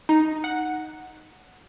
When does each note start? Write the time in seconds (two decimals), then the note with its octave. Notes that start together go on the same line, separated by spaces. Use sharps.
0.09 D#4
0.44 F#5